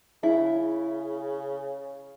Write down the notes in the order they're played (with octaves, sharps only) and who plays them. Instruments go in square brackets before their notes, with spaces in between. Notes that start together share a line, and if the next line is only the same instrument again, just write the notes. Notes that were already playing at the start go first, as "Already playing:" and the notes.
[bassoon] C#3 [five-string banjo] E4